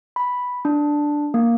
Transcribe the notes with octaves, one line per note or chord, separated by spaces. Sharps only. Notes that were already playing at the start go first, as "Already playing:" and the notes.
B5
D4
A#3